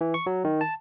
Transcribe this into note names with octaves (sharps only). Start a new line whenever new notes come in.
E3
C#6
F#3
D#3
A5